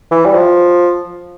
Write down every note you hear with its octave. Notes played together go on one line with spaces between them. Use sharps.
E3
G3
F3